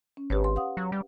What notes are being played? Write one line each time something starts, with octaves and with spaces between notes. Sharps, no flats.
C#4
G#1 G4 B4 C#5
C6
F5 F#5 D#6
F#3
G3